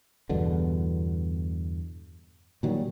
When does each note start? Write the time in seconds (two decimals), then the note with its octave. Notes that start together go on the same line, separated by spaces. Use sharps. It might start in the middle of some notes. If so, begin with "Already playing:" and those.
0.29 E2 G2 B2 D3
2.63 A#2 D#3 F#3 G3